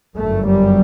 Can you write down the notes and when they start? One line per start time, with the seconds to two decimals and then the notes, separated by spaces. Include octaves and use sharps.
0.16 G1 F#2 A3
0.46 G3